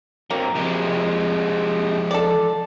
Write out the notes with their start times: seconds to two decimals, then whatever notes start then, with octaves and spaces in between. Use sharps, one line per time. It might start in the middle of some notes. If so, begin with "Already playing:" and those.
0.31 F#3 A#3 C4
0.55 C3 F3 G#3 G4
2.11 A4 D5